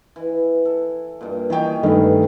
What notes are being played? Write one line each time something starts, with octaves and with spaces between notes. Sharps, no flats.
E3
A4
G2 A#2
D#3 E3 G#4 C#5 G5
G2 D#3 G3 A3 B3